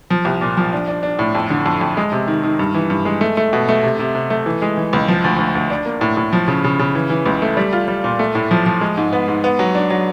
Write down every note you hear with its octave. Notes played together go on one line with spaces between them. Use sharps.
F3
C2
A#2
F3
D4
D4
D4
A2
F2
D3
F2
F2
G#3
C3
D#3
D#3
G2
E3
G2
G#3
A3
A3
B2
A3
C3
C3
C3
A3
E3
G#3
E3
C#2
F3
D2
D2
D2
D4
A#3
A2
A2
F3
C#3
C#3
C#3
E3
E3
C#2
A3
G3
F4
G3
A#2
A3
A2
F3
F3
G#3
G#2
B3
G#2
B3
F#3
D4
F#3